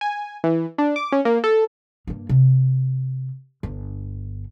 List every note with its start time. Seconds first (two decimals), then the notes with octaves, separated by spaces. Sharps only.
0.01 G#5
0.44 E3
0.78 D4
0.96 D6
1.12 C#4
1.25 A#3
1.44 A4
2.07 G2 A#3
2.29 C3
3.63 G1